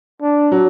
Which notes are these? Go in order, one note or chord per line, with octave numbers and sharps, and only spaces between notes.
D4
F#3